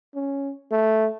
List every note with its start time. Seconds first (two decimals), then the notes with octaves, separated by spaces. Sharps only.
0.15 C#4
0.71 A3